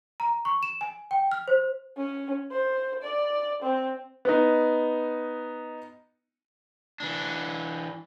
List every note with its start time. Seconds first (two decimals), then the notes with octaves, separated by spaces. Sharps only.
0.20 A#5
0.45 C#6
0.63 E7
0.81 G#5
1.11 G5
1.32 F6
1.48 C5
1.97 C#4
2.52 C5
3.03 D5
3.63 C4
4.25 B3 D#4
7.00 E3 D4